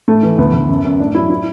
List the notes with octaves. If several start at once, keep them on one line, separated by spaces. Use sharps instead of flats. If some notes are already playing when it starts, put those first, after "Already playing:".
A2 A3
E3
D2 B3
D2
F#2
F#2
A2 D4
F#3 E4
E4